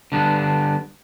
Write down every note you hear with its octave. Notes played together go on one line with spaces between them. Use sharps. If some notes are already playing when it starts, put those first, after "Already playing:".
D3 G3 B3 D4